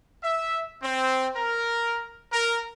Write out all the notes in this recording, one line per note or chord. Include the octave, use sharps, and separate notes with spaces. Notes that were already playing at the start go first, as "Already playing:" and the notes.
E5
C4
A#4
A#4